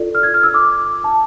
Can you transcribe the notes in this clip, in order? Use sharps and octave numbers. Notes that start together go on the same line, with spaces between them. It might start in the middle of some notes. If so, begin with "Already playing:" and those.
Already playing: F4 A4 D5
F6
G#6
F6
E6
D6
A5